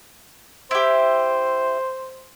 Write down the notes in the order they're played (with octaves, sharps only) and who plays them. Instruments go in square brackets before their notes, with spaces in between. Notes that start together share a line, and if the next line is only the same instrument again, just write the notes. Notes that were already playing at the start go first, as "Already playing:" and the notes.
[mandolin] E4 G4 [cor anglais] C5